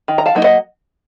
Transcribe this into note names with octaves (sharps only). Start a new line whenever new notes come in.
D#3
A#5
F5 A5
F#3 A#3 D#4
D#5 F#5